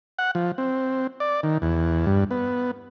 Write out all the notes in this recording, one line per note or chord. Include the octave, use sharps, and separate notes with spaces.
F#5
F3
C4
D5
D#3
E2
G2
B3